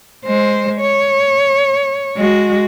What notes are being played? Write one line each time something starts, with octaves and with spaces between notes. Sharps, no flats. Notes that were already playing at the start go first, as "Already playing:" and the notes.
G#3 C5
C#5
G#3 F#4